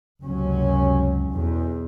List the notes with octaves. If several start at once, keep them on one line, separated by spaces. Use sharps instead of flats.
F#1 C#2 F#2 C3 F#3 C#4
B1 E2